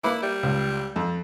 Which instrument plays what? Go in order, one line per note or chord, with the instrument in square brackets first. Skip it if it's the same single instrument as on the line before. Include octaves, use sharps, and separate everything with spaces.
[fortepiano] A#3 B4 D6 [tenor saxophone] E4
[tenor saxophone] G3
[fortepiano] C#2
F2